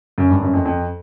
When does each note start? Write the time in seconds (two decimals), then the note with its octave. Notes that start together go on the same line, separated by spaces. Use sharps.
0.18 F#2
0.30 G2
0.42 F#2
0.53 F2
0.65 F2